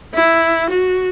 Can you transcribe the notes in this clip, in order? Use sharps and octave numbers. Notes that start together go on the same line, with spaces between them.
E4
F#4